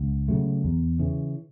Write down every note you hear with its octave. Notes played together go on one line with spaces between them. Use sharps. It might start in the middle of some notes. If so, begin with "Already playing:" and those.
Already playing: C#2
C#3 F#3 A3
E2
C#3 E3